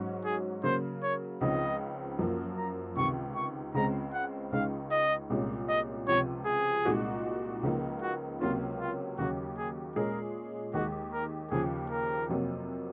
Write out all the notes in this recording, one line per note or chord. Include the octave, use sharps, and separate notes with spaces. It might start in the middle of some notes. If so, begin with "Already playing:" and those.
Already playing: G#2 F#3 C#4 F#4
G#4
C#3 F#3 A#3 C5
C#5
C#2 C#3 F3 C4 D#4 D#5
F#2 F3 A#3
A#5
C#2 C3 D#3 C#6
C#6
C#2 C#3 G#3 C4 A#5
F#5
C#2 C#3 G#3 D#4 F5
D#5
C2 A#2 G#3 C#4
D#5
C#2 C3 F3 C#5
G#4
C2 A#2 G#3 D#4 F#4
C#2 C#3 F3 A#3 D#4
F#4
C#2 C3 F#3 A#3 C#4 F4
F4
D#2 C#3 F#3 F#4
G#4
A#2 G#3 C#4 G#4 A#4
D#2 D#3 G#3 F#4
A#4
D#2 C#3 F3 G#4
A#4
F2 C3 F#3 A#3